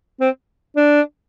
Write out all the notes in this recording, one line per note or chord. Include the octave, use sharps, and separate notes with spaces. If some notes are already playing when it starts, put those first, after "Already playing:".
C4
D4